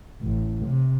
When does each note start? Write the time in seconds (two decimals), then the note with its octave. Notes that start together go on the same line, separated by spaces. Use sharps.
0.22 A1
0.66 C3